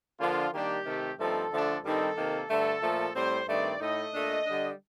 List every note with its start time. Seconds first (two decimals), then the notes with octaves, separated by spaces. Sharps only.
0.20 D3 F3 A#3 D4 F4
0.53 D#3 G3 A#3 D4 G4
0.85 C3 D#3 A3
1.18 G2 F3 A3 C4 D#4 A4
1.51 D3 F3 A3 D4
1.84 G2 D#3 G3 C4 D#4 A4
2.17 C3 D#3 A#3
2.49 G2 D3 A3 A4
2.82 A#2 F3 A3
3.15 A2 G3 C4 C5
3.48 G2 D#3 A3 C4 D5
3.81 A2 A3 D#4 D#5
4.14 A#2 A3 D4
4.46 D3 G3 D4